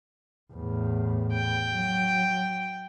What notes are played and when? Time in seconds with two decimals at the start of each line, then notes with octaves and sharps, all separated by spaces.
0.53 E2 A2
1.33 G5
1.71 F#3